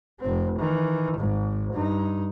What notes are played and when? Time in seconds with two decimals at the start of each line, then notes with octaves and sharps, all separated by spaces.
0.20 F1 C4
0.59 D#3 E3
1.18 G#1 G#2
1.73 G2 D#4